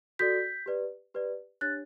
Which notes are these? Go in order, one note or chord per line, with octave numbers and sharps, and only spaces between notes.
F#4 A4 D5 G6 B6
G4 B4 D5
G4 B4 D5
D4 G4 C#5 F#6 A6